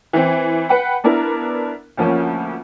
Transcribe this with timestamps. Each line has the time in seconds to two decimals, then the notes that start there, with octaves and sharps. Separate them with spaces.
0.13 E3 C4
0.69 B4 F#5 G5 B5
1.04 B3 D4 E4 A#4
1.97 D2 F3 A#3 C#4